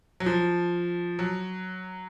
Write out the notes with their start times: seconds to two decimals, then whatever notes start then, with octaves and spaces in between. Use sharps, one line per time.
0.20 F#3
0.26 F3
1.19 F#3